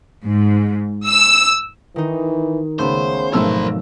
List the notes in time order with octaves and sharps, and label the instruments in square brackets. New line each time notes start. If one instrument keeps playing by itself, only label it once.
[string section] G#2
E6
[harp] D#3 D#4 [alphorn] E3
[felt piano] C#2 B5 [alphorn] C#3 [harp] A3 B3 [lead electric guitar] C5
[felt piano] G#1 A3 E6 [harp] B2 F3 F#3 [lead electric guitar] A#4 C5